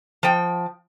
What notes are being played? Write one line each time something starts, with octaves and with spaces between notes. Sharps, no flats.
F3 G5